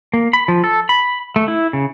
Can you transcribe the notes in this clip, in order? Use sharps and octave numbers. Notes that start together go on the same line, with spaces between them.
A#3
B5
F3
A4
B5
A3
E4
C#3